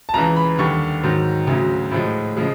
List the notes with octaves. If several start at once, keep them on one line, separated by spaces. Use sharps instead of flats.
A5
C#2 C#3 E3 A#5
B5
D#2 D3 G3 C#6
G#2 D#3 F#3
D2 C#3 F#3
A2 F3 G#3
C#3 F3 G#3